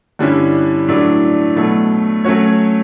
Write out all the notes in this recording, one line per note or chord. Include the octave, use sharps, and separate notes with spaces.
G2 D3 G3 C#4 E4
A2 F#3 A3 D4
B2 F#3 A3
F#3 A3 C#4 F#4 C#5